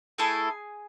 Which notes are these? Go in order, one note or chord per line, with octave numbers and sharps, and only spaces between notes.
A3 E4 G#4 A4 G#5